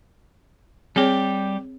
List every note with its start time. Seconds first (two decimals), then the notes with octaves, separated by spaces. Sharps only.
0.96 G3 C4 G4 G#4 C#5